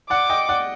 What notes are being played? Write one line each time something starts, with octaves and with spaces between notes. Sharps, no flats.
D5 F#5 D6
D#5 G5
D5 F#5